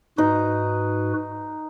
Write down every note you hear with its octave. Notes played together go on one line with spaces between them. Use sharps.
G#2 D#4 F#4 B4